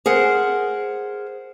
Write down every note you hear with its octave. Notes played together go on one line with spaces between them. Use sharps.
G#4 A#4 C5 F#5